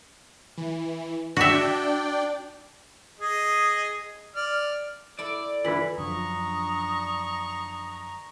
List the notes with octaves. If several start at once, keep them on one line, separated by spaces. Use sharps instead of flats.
E3
D4 F#4 D5 E5 G5
G#4 D#5
D5 F6
E4 A4 D5
D3 E3 E4 B4 B6 F#7
F#2 D3 F3 D4 A#5 C#6 D#6